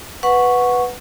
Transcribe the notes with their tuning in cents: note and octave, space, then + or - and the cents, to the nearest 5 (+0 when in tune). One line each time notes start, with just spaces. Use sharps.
B4 +0 F#5 -10 C#6 +0